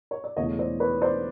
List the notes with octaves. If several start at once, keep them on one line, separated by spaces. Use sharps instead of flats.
C#5
D5
E1 E2 C#3 E3 A3 C#5 D#5
C5 D5
B4 C#5
C5 D5